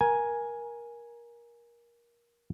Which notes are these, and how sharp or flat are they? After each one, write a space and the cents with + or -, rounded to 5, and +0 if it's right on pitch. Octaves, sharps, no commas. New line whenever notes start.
A#4 +20 G#5 +0